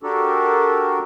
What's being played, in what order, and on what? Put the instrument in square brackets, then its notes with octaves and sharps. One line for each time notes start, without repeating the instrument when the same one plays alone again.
[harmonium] D4 F#4 G4 A4 A#4